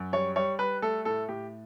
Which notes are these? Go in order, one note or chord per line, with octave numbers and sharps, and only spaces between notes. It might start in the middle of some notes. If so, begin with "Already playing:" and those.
Already playing: F#2
G3 C#5
G3 C#5
G3 B4
A3 A4
A2 A4
A2 G4